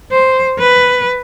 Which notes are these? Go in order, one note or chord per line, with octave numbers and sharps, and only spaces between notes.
C5
B4